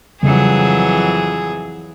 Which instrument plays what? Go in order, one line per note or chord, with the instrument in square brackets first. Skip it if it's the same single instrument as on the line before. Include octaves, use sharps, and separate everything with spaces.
[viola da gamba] F2 E3 F#3 [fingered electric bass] C#3 G3 [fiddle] G#4